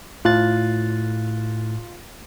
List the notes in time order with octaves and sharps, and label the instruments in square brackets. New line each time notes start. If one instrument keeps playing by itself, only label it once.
[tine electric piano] A2 F#6 A6 [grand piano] F4